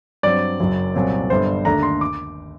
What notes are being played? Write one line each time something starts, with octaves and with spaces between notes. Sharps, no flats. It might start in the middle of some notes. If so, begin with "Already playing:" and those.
G2 F#3 C4 D5
F#1 F#2 F#3
C2 A#2 F#3 C4
G1 G2 F#3 C5
D#2 D3 A3 D4 A#5
C6
D6